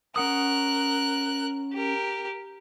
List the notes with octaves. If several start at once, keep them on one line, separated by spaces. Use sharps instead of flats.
C#4 A#4 F#5 D#6 F#6
G4 A#4